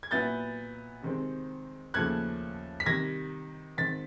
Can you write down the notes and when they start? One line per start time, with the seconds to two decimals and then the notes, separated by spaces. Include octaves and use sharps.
0.03 G#6
0.11 A#2 F#3 B3 E4 G6 A6
1.03 C3 D#3 G#3 C4
1.94 D#2 C#3 F3 A3 C#4 F#6 G#6
2.80 B6
2.86 C3 D#3 G3 G#6 A#6
3.78 G#2 D#3 G#3 C4 A6 B6